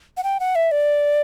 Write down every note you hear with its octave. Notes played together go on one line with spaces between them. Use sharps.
F#5
G5
F#5
E5
D5